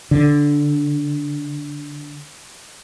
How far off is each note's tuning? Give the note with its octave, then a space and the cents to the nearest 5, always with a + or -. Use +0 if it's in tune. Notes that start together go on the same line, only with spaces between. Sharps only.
D3 -5